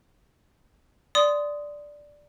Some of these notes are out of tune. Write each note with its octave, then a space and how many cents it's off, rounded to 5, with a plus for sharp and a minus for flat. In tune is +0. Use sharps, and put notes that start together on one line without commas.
D5 +0 C6 -15 D#6 +0